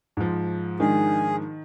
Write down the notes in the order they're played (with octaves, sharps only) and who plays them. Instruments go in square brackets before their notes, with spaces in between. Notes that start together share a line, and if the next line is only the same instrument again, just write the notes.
[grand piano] G#2 F3
[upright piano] D#3 [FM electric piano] G#3 D4 [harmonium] G#4